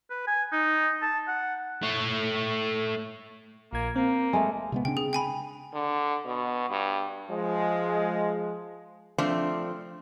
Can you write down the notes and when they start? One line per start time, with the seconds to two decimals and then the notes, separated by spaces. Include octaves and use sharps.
0.10 B4
0.27 G#5
0.52 D#4
1.02 A5
1.28 F#5
1.83 A3 C#5
3.73 A#1 A#3 G#6
3.96 A#3 C4
4.33 G#3 A3
4.72 C3 G#3 B3
4.85 C#3 C4 D4 G5
4.97 G#4
5.13 G5 G#5 B5
5.74 D3
6.25 B2
6.70 G2
7.31 F3 G#3
9.18 F3 A3 C4 D4